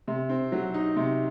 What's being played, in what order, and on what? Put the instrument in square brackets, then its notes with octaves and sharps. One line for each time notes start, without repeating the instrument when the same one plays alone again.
[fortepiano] C3
C4
F#3
D#4
C3